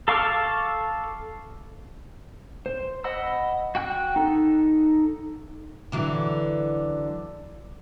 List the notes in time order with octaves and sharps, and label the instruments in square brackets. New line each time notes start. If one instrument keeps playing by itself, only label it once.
[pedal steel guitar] A4 F5 C#6 D6 F6
C5
D#5 F#5 B5 E6
F#4 G5 F#6
D#4 A4
[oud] D3 E3 F#3